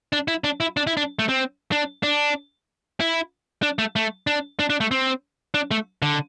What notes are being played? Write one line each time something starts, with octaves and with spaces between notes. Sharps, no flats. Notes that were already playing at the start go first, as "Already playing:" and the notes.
D4
E4
D4
E4
D4
E4
D4
A3
C4
D4
D4
E4
D4
A3
A3
D4
D4
D4
A3
C4
D4
A3
D3